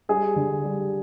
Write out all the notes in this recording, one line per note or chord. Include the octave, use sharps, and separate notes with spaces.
G3 G#4
D3
G3